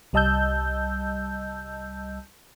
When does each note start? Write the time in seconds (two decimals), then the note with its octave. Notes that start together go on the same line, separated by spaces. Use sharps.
0.13 C2 G3 D#5 A5 E6 G6